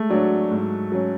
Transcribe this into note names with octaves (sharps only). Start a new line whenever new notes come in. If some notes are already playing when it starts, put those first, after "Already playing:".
Already playing: G#3 A3
F#3 D4 F#4 C#5
G#2
F#3 C#4